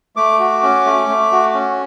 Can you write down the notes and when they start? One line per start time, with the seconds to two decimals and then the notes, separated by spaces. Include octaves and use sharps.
0.16 A3 D6
0.39 F#4
0.63 C#4
0.85 A3
1.09 A3
1.32 F#4
1.54 C#4